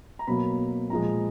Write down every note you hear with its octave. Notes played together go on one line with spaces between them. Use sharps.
A#5
B2 F#3 A#3 B5
A#2 F3 G#3 A#5